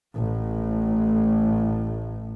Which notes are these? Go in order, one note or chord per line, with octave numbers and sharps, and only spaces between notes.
A1 A2